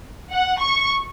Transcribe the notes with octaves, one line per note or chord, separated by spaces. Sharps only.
F#5
C#6